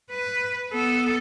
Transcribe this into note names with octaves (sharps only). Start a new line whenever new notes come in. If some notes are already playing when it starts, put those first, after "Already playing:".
B4
B3 A4